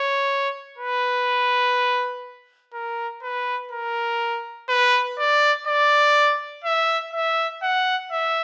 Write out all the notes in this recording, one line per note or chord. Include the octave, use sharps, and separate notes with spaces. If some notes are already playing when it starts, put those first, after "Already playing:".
Already playing: C#5
B4
A#4
B4
A#4
B4
D5
D5
E5
E5
F#5
E5